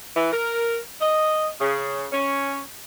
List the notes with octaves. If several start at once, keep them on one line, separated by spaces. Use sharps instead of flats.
E3
A#4
D#5
C#3
C#4